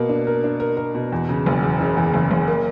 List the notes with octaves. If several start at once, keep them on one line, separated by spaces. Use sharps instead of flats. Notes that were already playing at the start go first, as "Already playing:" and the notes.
Already playing: B2 A#3
D4
A#4
D4
A#4
A#4
B2
E2
C#3
F#1
E2
C#3
E2
F#1
F#1
A#3